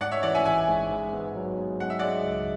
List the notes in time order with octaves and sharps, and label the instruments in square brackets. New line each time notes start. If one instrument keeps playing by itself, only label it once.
[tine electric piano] G#2 [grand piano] D5 F#5
[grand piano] C#5 E5
[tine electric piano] E3 [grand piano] D5 F#5
[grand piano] E5 G#5
[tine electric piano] A1 [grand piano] E5 G#5
[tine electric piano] G#2
G#2
B3
F#3
G#2
[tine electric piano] G#3 [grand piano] F#5
[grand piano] E5
[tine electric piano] G#3 [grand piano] D5 F#5
[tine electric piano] C#2